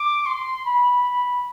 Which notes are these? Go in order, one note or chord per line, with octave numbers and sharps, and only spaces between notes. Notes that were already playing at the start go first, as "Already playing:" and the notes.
Already playing: D6
C6
B5